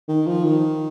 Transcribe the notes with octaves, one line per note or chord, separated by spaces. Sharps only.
D#3
F3
D#3